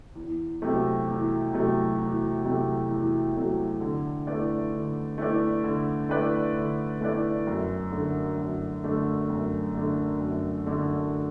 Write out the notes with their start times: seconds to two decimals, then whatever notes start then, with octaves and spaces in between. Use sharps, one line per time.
0.15 E2
0.62 C3 F#3 A3
1.07 E2
1.53 C3 F#3 A3
1.98 E2
2.44 C3 F#3 A3
2.89 E2
3.35 C3 F#3 A3
3.80 D3
4.27 A3 E4 B4 D5
4.73 D3
5.18 A3 E4 B4 D5
5.64 D3
6.09 A3 E4 B4 D5
6.55 D3
7.01 A3 E4 B4 D5
7.47 F#2
7.92 D3 A3 D4
8.37 F#2
8.84 D3 A3 D4
9.29 F#2
9.74 D3 A3 D4
10.20 F#2
10.66 D3 A3 D4